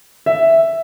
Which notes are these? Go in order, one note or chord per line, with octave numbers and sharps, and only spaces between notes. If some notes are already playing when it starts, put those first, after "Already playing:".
E5